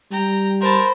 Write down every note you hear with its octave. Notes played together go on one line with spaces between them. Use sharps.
G3 G5 A#5
A#4 C5 A5 B5